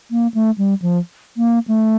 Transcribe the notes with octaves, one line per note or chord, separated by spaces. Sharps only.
A#3
A3
G3
F3
A#3
A3